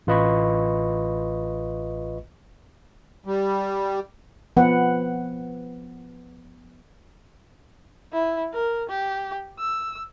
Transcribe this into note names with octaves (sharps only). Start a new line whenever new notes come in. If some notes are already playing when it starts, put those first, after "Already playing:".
A1 F4 B4 D#5 B5 C#6
G3
F3 B3 B4 F#5
E4
A#4
G4
E6